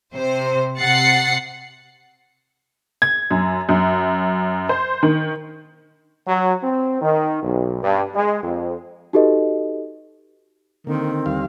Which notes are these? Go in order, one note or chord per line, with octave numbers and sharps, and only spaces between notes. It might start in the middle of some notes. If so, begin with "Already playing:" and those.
C3 C5
C3 F#5 A6 C7 C#7
G#6
F#2
F#2
C5
D#3
F#3
C4
D#3
B1
G2
G#3
F2
D#4 F#4 G4 A4 B4 D#5
D3 D#3 A#3 C4
D#2 G3 F5